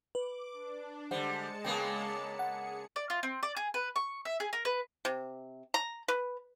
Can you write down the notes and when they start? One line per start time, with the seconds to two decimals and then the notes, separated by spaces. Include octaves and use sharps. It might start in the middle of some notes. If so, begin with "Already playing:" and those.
0.15 B4 D6
0.53 D4
1.11 D3 G3 G#3 C5 F#5 A5 C#7
1.65 C#3 A#3 B3 G5
2.39 G#4 F#5 C#7
2.96 D5
3.10 F4
3.23 C4
3.43 D5
3.57 G#4
3.74 B4
3.96 C#6
4.25 E5
4.40 G#4
4.53 A#4
4.65 B4
5.05 C3
5.74 A#5
6.08 B4